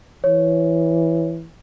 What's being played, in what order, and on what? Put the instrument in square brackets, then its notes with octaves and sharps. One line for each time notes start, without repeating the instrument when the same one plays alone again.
[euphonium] E3 [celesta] C#5